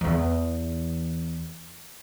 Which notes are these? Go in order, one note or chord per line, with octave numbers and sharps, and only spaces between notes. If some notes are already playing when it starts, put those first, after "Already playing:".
E2 E3